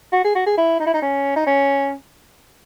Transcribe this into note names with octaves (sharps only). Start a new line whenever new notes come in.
F#4
G#4
F#4
G#4
E4
D#4
E4
D#4
C#4
D#4
C#4